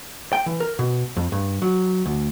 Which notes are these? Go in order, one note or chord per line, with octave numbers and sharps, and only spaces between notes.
G5
E3
A#4
B2
F2
G2
F#3
D2